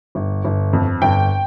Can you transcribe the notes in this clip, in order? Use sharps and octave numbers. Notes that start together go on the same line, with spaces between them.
G1
G1
F2
G1 G5